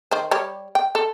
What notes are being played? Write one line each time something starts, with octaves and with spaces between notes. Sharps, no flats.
D#3 C5
G3 G4 C#5
G5
A4